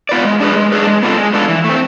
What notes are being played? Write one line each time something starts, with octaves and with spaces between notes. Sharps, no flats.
B3 F4 B4 D5
G#3
D4 G#4 B4
G#3
D4 G#4 B4
G#3
B3 D4 F4 A4
G#3
B3 D4 F4 A4
E3
A3
C4